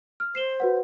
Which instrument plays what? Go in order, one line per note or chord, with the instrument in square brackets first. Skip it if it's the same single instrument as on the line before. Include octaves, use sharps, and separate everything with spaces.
[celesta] F6
[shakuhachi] C5 [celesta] C7 E7 G7
[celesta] F#4 B4 F#5